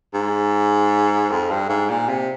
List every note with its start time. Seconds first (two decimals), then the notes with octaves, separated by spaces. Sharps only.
0.14 G#2
1.31 F2
1.51 G2
1.69 G#2
1.90 A#2
2.09 C3